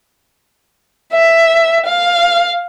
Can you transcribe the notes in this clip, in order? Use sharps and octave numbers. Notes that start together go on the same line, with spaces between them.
E5
F5